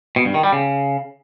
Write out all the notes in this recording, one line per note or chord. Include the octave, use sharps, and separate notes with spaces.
B2
G2
D#3
G3
C#3